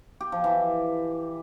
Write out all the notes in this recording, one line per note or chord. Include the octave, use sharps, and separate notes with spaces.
G4
F3
E3